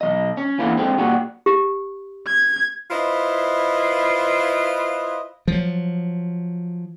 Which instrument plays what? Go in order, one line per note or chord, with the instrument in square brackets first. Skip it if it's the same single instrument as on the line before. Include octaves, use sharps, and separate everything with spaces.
[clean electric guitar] B1 D#3 D#5
C#4
D3 E3 A#3 B3 E4
D3 G#3 C4
A#2 G3 F#4
[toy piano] G4
[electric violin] G#6
[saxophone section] E4 F4 B4 C5 D#5
[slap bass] F3 F#3